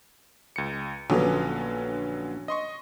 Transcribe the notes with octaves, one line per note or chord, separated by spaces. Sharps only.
C#2 C#7
A#1 D3 F#3 B3 C#4
D#5 C6 C#6